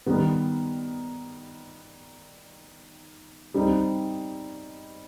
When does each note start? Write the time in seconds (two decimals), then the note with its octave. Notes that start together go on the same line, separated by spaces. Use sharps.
0.06 D#3 G3 B3
3.54 G3 C4 D#4